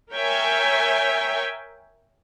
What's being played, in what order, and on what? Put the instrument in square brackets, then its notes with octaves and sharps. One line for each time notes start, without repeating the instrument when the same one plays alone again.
[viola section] A#4 C#5 E5 G5 G#5